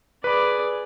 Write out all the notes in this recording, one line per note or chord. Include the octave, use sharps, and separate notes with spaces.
G#4 B4 D5 B5